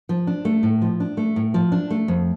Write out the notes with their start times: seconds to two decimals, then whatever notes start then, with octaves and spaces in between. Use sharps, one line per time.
0.09 F3
0.27 D4
0.45 A3
0.63 A2
0.82 F3
1.00 D4
1.17 A3
1.36 A2
1.54 F3
1.72 D4
1.90 A3
2.08 F2